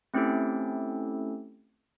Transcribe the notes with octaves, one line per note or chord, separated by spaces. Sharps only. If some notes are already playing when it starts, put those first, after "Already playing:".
A3 C4 C#4 E4 G4 A4